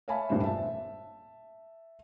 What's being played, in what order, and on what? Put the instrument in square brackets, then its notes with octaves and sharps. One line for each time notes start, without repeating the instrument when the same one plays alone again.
[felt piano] C#5 E5 F5 G#5 A5 B5
E1 G2 A#2 G3 C5
E5 A5